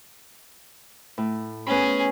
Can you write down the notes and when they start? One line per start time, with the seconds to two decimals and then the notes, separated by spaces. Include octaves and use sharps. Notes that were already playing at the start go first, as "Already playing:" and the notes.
1.18 A2
1.67 B3 C#4 G#4 B5